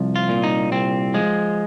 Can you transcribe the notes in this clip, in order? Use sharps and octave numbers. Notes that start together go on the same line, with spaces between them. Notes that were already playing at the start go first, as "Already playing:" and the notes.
Already playing: C2 F3
F4
A#2
D#4
C2 C4
F3 G#3